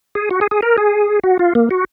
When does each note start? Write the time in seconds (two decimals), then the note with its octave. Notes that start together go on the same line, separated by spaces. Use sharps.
0.15 G#4
0.31 F#4
0.41 G#4
0.51 G#4
0.62 A#4
0.78 G#4
1.23 F#4
1.39 F4
1.55 A#3
1.71 F#4